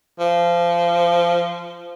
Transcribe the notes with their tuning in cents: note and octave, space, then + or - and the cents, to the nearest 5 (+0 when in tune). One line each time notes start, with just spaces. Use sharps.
F3 -20